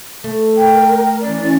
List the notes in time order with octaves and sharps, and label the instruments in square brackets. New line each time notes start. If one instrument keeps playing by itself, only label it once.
[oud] A3
[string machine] A#4 [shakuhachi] G5
[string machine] E3 C#4 [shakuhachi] D5